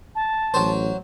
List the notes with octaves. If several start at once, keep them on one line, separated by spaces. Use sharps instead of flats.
A5
A1 F#3 C5